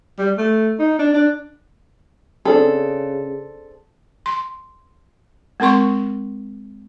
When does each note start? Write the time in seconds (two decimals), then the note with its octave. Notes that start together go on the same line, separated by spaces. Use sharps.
0.19 G3
0.38 A3
0.79 D#4
0.99 D4
1.14 D4
2.45 C#3 C4 D4 G#4 A4
4.26 C6
5.60 G#3 C4 A#4 C6 C#6